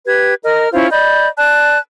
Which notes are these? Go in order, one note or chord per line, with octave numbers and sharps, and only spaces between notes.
G4 B4 G#6
A#4 D#5 F6
C#4 E4 F4 C5
D5 D#5 B5 G6
D5 A5 F#6